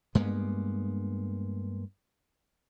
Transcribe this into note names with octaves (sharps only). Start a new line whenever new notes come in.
G2 G#3 A#3 B3